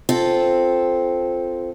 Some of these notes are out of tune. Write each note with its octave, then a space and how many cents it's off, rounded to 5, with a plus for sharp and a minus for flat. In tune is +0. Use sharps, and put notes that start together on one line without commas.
C4 +0 F4 +0 A4 -5